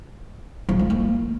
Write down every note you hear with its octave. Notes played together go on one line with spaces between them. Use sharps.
F3
G#3
A#3